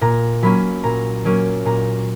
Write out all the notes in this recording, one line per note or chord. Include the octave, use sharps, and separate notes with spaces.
A#2 A#5
F#3 A#3 C#4 B5
A#2 A#5
F#3 A#3 C#4
A#2 A#5